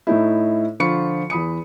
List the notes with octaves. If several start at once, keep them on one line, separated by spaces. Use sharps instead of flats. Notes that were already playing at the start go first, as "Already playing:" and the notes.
A2 A3 D#4 E4
D3 F3 F4 B5 C#6 C#7
E2 B5 D#6 C#7